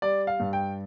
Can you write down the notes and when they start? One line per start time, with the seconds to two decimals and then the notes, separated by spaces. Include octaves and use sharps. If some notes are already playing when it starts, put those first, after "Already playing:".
0.02 G3 D5
0.27 F5
0.40 G2
0.53 G5